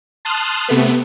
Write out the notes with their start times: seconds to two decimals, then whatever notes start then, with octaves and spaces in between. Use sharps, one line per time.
0.25 A5 C6 D#6 F6 F#6
0.68 C3 A3 B3